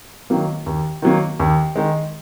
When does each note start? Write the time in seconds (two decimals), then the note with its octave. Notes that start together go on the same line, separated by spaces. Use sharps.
0.30 D#3 F#3 A#3
0.66 D#2
1.02 D#3 F#3 A#3
1.40 D#2
1.76 D#3 G#3